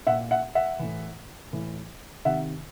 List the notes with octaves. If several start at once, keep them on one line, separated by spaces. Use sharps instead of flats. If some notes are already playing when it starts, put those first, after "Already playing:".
A#2 E5 F#5
E5 F#5
E5 F#5
A2 E3
A2 E3
C3 D#3 E5 F#5